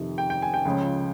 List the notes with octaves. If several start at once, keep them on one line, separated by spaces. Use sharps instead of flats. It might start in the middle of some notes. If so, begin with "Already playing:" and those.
Already playing: F2 C3 D#3
G5
G5
G#5
G5
C#2 C#3 F3